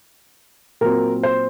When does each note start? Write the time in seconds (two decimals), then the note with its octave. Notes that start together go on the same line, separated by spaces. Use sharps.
0.81 A#2 F#3 C4 A#4
1.23 C5